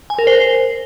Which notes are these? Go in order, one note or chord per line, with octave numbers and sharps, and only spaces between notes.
G#5
A#4
C5